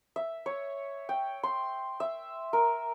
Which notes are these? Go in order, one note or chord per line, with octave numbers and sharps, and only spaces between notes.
E5
C#5
G5
C6
E5
A#4